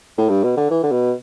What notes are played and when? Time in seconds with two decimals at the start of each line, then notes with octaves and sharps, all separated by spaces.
0.18 A2
0.29 G2
0.43 B2
0.57 D3
0.71 E3
0.83 D3
0.91 B2